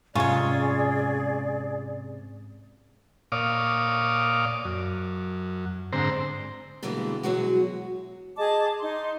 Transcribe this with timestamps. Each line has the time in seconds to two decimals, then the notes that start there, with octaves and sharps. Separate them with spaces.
0.15 G#2 C3 C#4 F4 G#4 C#5 D5
3.32 A#2 C#5 D5 F5 D6 D#6
4.65 F#2
5.93 G#2 D3 C4 C5 A#5
6.83 B2 D3 E3 G3 G#3 A#3
7.23 B2 E3 F#3 G#3 F#4
8.37 G#4 D#5 A5 D6
8.80 D#4 C6